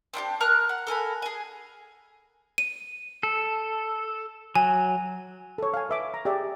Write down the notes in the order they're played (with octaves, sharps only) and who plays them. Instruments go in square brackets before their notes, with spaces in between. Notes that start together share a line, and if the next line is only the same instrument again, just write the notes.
[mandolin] C4 D4 E4 G4
A#4 A#5 F6 F#6
F#5
A4 A#4 G#5 B5
G#4 G#5
[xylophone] D#7
[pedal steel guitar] A4
[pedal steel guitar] F#3 [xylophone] G#5
[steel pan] A4 C#5
F5 G#5
B4 E5 D6
A#5
G4 G#4 D5 E5